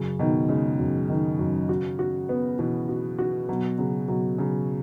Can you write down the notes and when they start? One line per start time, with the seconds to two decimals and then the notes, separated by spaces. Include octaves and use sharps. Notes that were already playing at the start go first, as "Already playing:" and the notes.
Already playing: F#2 C#3
0.19 B2 D#3
0.49 C#3 G#3
0.79 F#2
1.09 D#3
1.39 F#2
1.69 F#4
1.99 F#4
2.29 B3
2.59 B2 E3
2.89 F#4
3.18 F#4
3.49 B2 F#3
3.78 C#3 F#3
4.08 B2 F#3
4.38 C#3 F#3